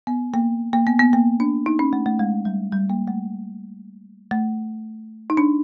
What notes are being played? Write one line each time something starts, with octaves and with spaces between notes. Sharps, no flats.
B3
A#3
A#3
B3
B3
A#3
D4
D#4
C#4
A3
A3
G#3
G3
G3
A#3
A3
A3
D#4
D4